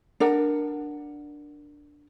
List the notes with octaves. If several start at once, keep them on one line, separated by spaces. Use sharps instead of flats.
D4 A#4 F#5